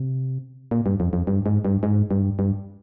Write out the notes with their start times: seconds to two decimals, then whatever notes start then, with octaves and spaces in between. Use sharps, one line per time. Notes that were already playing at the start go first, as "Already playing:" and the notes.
Already playing: C3
0.71 A#2
0.86 G2
1.00 F2
1.13 F2
1.27 G2
1.46 G#2
1.65 G2
1.83 G#2
2.11 G2
2.39 G2